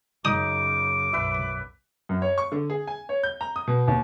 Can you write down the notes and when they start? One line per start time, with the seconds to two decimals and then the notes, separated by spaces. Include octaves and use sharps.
0.25 F#2 C#3 D#4 A#4 D6 D#6
1.13 B1 F#2 B4 E5
2.09 F#2
2.22 C#5
2.38 C#6
2.52 D3
2.70 G#4
2.87 G#5
3.09 C#5
3.23 G6
3.41 A#5
3.56 D#6
3.67 B2
3.88 D#2